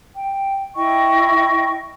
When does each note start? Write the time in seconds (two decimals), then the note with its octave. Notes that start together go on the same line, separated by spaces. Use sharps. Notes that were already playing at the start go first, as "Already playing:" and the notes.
0.15 G5
0.76 E4 D#5 G5 C#6